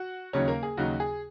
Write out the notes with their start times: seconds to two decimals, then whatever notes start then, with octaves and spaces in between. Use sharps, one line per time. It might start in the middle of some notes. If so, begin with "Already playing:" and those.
Already playing: F#4 F#5
0.33 D#2 C#3 F#3 C#4 D#4 C#5
0.48 A#3 A#4
0.63 G#4
0.77 D#2 C#3 F#3 D#4 F#4
1.00 G#4